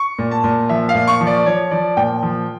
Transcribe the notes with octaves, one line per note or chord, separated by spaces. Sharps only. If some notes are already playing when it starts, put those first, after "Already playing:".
Already playing: C#6
A#2
A5
A#2
F3 E5
F5
A#2
C#6
F3
D5
F3 C#5
F3 D5
A#2 G5
F3